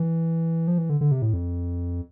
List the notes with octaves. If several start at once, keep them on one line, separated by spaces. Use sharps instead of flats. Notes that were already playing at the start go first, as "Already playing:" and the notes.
Already playing: E3
F3
E3
D3
D3
C3
A2
F2